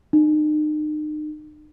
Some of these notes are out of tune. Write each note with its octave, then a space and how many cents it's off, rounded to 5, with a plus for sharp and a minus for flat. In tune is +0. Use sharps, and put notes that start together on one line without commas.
D#4 -40